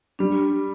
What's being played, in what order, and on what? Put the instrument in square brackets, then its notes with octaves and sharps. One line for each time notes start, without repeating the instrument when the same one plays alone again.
[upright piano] G3 [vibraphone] D4